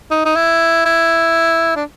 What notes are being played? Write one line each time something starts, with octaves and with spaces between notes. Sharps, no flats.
D#4
D#4
E4
E4
D4